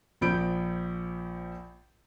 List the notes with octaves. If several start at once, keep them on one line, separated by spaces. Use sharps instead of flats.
A#1 F3 B5 G6 D7